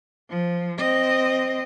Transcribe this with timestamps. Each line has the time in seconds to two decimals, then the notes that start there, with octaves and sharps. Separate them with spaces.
0.29 F3
0.78 C4 D#5